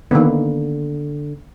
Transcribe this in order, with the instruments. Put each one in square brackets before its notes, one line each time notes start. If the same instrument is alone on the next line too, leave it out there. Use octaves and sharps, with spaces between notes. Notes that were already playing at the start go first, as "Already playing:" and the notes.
[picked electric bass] D3 [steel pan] D#3 A#3 B3